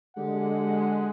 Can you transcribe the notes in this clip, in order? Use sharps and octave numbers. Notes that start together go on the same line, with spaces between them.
D3 G#3 G4 F#5